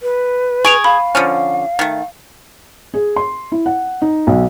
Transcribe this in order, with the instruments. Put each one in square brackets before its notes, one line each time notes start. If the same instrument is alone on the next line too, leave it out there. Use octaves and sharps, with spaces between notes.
[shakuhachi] B4
[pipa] G#4 [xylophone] C#6 D7 F7
[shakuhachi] F5 [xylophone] B5
[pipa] D3 F3 C#4
D#3 A3
[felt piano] G#4
C6
E4
F#5
D#4
B1